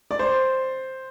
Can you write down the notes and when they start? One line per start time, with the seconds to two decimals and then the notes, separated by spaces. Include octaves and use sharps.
0.11 D5
0.19 C5